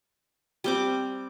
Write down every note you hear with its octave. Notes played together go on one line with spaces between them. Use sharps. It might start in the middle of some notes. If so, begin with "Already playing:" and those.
G3 C4 D6